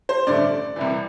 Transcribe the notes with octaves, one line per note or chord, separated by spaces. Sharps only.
C5
A1 G2 D3 A3 D5
C2 C3 E3